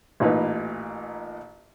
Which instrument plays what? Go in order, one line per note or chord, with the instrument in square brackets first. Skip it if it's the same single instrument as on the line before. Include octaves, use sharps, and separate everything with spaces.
[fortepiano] A1 A#2 D#4 B4